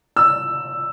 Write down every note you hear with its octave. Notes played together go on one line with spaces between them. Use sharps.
E6